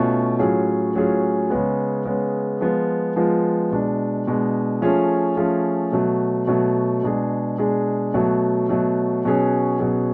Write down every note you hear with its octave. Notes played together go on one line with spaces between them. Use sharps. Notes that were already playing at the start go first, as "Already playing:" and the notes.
Already playing: B2 A3 C#4 F4
A2 F#3 C#4 F4 G#4
A2 F#3 C#4 F4 G#4
C#3 G#3 B3
C#3 G#3 B3
F3 G#3 B3 F4
F3 G#3 B3 F4
B2 G#3 D4
B2 G#3 D4
F3 A3 C#4 F4 G#4
F3 A3 C#4 F4 G#4
B2 F#3 A3
B2 F#3 A3
B2 G#3 D4 G#4
B2 G#3 D4 G#4
B2 F#3 A3
B2 F#3 A3
B2 F#3 C#4 G#4
B2 F#3 C#4 G#4